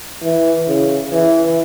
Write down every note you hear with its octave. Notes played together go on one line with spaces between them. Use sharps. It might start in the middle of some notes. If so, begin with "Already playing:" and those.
E3
C#3
E3